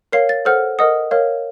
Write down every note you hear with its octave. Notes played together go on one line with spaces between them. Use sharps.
A#4 C#5 F5 C7
A6
A4 C5 F#5 F6
A#4 D#5 F#5 D#6
A#4 C#5 F5